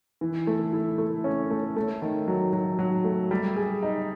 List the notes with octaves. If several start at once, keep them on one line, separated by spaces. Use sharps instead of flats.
E3
A3
E4
A3
C#4
A3
A3
D#3
F#3
F#3
F#3
A3
G3
G#4
D#4